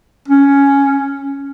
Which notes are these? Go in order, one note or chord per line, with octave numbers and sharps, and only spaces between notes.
C#4